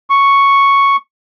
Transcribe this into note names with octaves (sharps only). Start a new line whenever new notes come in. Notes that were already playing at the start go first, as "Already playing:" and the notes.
C#6